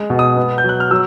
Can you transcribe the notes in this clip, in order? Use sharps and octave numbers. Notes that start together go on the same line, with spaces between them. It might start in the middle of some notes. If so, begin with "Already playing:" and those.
Already playing: G#3
B2
D#6
B3
G6
F#3
F#6
F6
F#3 E6